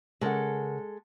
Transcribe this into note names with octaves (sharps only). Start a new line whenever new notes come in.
C#3 G#3 A4 A#4 F#5